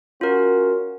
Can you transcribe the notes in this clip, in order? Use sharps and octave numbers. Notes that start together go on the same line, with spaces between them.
C#4 F4 F#4 A#4